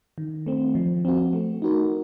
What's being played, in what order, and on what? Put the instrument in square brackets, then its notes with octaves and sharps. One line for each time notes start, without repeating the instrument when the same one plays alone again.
[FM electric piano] D#3
A3 C4
F3
C4 F#4
A3
D#4 F#4 A#4